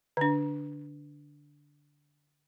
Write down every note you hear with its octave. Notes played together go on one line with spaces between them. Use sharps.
D3 D4